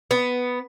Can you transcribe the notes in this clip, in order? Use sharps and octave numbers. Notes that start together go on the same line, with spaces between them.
B3